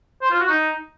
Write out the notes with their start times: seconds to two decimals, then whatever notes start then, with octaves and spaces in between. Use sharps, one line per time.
0.22 C5
0.31 F4
0.40 F#4
0.49 D#4